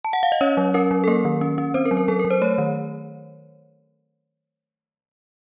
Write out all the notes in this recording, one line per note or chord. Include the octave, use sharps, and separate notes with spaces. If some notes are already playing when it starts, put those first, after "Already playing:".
A5
F#5
F5
D#5
C#4 C#5
F#3
C#4 A#4
F#3
A4
A#3 A#4
D#3
C#4
C#4
C4 C5
A#4
F#3
A#4
F#3 A4
A#4
F#3
C5
A3 C#5
D#3